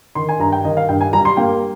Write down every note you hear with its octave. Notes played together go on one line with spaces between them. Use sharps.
D#3 C6
G#5
G2 A#5
G5
D#3 D#5
F5
G2 G5
G#5
G3 A#5
C6
A#3 G5